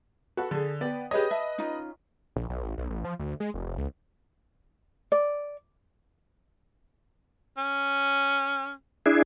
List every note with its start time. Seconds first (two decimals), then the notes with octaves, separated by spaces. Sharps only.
0.37 F#4 A4 B4
0.51 D3 G#4 A4
0.81 B3 D5 G5
1.11 G4 G#4 B4 C#5 D#5
1.31 E5 A5
1.58 C#4 D#4 F4
2.36 A#1
2.49 B1
2.63 A1
2.78 B1
2.90 A1
3.04 F3
3.19 D2
3.40 G#3
3.54 F1
3.66 F1
3.78 C#2
5.12 D5
7.57 C#4
9.06 D4 E4 G#4